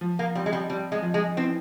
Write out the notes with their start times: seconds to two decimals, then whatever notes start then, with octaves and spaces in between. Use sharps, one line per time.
0.01 F3
0.19 A#3
0.35 G3 C4
0.46 G#3
0.53 G3
0.70 G3 C4
0.92 G#3
1.02 F3
1.14 G#3
1.37 E3 C4